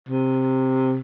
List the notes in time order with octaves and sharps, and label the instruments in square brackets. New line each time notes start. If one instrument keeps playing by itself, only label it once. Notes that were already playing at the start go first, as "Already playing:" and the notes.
[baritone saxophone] C3